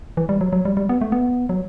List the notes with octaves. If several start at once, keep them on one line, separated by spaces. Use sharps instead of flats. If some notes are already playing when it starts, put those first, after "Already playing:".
E3
G3
F#3
F#3
G3
G3
B3
A3
B3
F#3